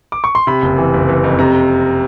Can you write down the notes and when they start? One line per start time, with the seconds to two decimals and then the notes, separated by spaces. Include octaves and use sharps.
0.12 D6
0.24 C#6
0.35 C6
0.47 C3 B5
0.62 F#1
0.78 E3
0.94 F#1
1.09 E3
1.24 F2
1.39 C3 A#5